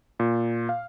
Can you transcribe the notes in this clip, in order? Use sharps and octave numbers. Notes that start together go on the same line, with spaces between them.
A#2
F5